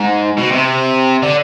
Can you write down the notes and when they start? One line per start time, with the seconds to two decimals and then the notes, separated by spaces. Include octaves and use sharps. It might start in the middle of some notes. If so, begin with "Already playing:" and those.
Already playing: G#2
0.37 B2
0.51 C3
1.22 D3